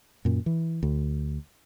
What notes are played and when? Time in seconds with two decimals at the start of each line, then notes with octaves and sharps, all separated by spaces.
0.25 F#2 A#2
0.46 E3
0.83 D2